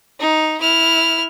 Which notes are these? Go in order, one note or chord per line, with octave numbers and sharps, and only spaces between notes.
D#4
E4 F6